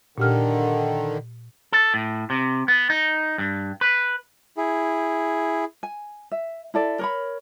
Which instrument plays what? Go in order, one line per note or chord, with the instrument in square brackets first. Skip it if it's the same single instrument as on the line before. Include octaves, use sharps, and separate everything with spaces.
[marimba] A#2 G4 F6 [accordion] D3 D#3
[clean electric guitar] A4
A2
C3
B3
D#4
G2
B4
[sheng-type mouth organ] E4 G#4
[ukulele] G#5
E5
E4 A4 D5
A#4 C#5 B5